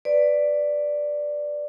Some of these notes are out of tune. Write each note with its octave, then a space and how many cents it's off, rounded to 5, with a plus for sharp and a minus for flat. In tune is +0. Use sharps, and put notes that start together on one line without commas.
B4 +10 D5 +0